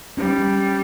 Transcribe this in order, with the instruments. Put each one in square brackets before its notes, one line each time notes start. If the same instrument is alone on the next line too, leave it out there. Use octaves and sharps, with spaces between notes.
[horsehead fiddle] G3 [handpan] C#4